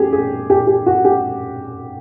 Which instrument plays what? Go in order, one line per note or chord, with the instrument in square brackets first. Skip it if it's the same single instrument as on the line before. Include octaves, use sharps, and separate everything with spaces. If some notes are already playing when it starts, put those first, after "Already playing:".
Already playing: [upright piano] C#4 G4 G#4
G#4
G4
G4
F#4
G4